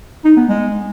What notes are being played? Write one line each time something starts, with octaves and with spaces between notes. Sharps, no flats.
D#4
B3
G#3